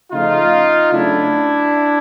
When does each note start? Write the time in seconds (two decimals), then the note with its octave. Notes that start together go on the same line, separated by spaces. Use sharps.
0.11 C#3 F3 A3 D#4 F4
0.91 C#3 F#3 A3 D4 E4